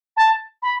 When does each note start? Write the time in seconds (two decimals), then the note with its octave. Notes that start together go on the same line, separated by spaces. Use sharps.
0.16 A5
0.62 B5